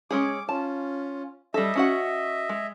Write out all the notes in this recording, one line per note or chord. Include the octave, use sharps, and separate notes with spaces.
G#3 C#4 G#4 D6
C#4 F4 A5
G3 A4 D#5 E5
C#4 F#4 F#5
G#3